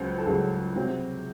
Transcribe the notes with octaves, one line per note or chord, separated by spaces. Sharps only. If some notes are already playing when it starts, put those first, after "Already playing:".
Already playing: C#2 C#3 F#3 C5
A4
C#2 C#3 F#3 G#4
C3 F#3 C4